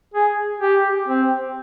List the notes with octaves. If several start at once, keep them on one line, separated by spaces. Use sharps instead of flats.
G#4
G4
C4